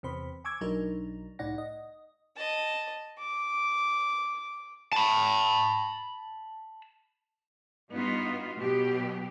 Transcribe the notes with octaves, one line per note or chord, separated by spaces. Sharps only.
E2 C3 C5 B5
G#5 C#6 D6 E6 G#6
B1 F#3 D4 D#4 A#4
C2 A2 D#4 D5 F#5 A#6
D#5
D#5 A5
D6
A5 B5
G2 B3 D#4 F4 F#4
B2 F#3 G4